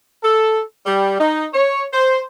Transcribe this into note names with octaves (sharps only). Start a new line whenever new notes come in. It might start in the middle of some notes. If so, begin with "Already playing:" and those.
A4
G3
D#4
C#5
C5